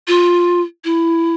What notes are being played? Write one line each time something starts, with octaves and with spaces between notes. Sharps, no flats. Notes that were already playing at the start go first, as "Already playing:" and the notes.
F4
E4